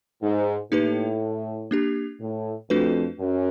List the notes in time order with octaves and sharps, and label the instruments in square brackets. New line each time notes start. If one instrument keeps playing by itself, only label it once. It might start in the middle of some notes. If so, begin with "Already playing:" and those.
[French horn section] G#2
[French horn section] A2 [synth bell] A#3 D#4 G4 B4
[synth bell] A#3 D4 G4
[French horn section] A2
[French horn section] F2 [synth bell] A3 D4 F#4 B4
[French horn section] F#2